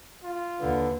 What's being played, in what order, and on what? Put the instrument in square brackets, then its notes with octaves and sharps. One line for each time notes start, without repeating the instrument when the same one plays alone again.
[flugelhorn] F4
[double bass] D#2 [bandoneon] D3 [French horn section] D4 B4